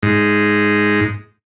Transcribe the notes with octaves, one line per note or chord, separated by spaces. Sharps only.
G#2